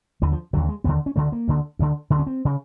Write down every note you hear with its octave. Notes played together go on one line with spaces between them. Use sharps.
D#2 D3 E3
F3
D#2 D3 F#3
G#3
D#2 D3 B3
C#4
D2 D3 A3
A#3
D2 D3
D2 D3
D2 D3
C#4
C4
C#3